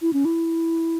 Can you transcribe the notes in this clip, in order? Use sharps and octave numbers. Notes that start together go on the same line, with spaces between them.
E4
C#4
E4